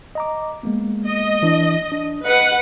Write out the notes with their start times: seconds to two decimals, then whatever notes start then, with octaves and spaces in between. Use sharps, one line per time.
0.15 D#5 A#5 D6
0.63 G#3 A#3 B3
1.08 D#5
1.42 E3 D4 E4
1.92 D4
2.25 B4 D#5 F#5